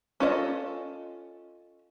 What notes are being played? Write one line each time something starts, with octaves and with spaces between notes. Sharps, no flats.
C#4 F4 A4 D5 D#5